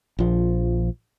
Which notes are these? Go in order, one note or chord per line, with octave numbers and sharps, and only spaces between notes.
A#1 F3